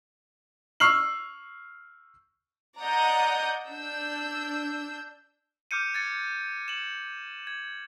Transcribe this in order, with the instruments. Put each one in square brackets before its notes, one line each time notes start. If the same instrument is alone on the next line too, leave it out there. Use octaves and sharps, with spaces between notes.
[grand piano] C#6 E6 F6 C7 F#7
[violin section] D5 D#5 F#5 A#5 D#6 G6
D4 E6 G6
[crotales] D6 F6 G6 C#7 D#7
G#6 A6 C#7
E7 F#7
G#6